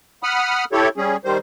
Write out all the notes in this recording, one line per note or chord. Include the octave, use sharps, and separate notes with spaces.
F#5 B5 D#6 F6
E4 G4 A4 C#5
G3 C#4 G#4
D#3 G3 C5